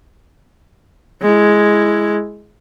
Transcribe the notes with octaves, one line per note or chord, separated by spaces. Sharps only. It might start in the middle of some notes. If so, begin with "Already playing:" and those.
G#3 E4